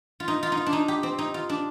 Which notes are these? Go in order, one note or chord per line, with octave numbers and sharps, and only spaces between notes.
F4
D#4
F4
D#4
F4
D4
D#4
G4
C4
D#4
F4
D4